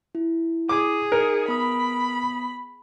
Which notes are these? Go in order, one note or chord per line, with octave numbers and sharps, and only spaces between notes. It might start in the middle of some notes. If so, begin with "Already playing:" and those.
E4
G#4 D6
D#4 A#4 C#7
B3 B5 D#6